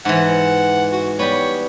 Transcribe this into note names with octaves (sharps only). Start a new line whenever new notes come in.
G#2 E3 F#5
F#4
G3 B3 C#5